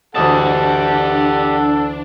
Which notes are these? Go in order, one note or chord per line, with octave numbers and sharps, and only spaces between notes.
D2 E3 D4 G4 A4 D#5 F#5 A5